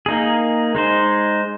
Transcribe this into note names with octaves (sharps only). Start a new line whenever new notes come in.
A#3 D#4 G#4
G#3 D#4 C5